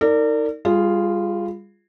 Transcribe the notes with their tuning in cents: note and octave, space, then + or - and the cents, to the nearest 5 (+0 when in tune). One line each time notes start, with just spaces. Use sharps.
D#4 +20 A#4 -35 D5 +0
G3 +35 F4 -5 G#4 +0